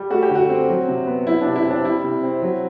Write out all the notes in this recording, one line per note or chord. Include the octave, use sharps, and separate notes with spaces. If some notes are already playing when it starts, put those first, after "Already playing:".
Already playing: G3
A3 F#4
G4
D3
F#4
C4
F#3
C3
B3
F#3 E4
C3 D4
E4
C4
D4
G3 E4
C3
C4
F#3